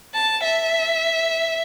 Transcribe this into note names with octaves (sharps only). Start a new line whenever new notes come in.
A5
E5